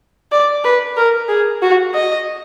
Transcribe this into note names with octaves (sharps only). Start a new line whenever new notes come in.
D5
B4
A#4
G#4
F#4
D#5